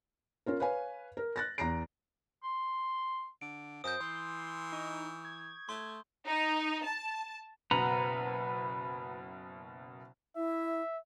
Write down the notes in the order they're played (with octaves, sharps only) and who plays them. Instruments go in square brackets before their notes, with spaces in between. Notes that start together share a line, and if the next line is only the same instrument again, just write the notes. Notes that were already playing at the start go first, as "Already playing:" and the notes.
[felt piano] C#4 F4 A#4
B4 C#5 F5 G#5
A#4
F#6 A6 A#6
E2 A#5 A#6 C7 D7
[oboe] C6
[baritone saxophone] D3 [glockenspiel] D7
[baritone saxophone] F#2 [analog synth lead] C5 [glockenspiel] D#6 G6
[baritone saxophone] E3 [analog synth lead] C6
[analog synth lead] D#4 [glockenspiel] C#6
[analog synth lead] G#6
[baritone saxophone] A3 [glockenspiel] C6
[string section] D#4
A5
[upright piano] F#1 B2 [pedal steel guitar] B4 F#5 A#5
[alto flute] E4 [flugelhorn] E5